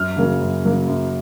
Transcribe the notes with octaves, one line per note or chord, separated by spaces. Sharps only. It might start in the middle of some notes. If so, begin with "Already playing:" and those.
Already playing: F#2 F6
C#3 F#3 A#3
F#2
C#3 F#3 A#3
F#2